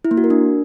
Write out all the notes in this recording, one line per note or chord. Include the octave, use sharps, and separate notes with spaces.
E4
A#3
F#4
A#4
D4